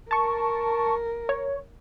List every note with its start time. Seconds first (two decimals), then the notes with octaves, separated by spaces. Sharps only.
0.11 A#4 A5 C#6
1.29 C#5